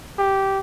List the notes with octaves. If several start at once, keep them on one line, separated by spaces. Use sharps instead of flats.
G4